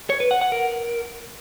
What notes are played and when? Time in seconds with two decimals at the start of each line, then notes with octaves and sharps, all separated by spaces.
0.10 C#5
0.20 B4
0.31 F#5
0.41 F#5
0.52 A#4